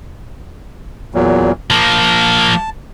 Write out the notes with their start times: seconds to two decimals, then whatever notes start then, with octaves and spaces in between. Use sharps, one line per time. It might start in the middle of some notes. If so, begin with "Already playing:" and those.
1.14 E2 A#2 F#3
1.70 F3 A#3 A5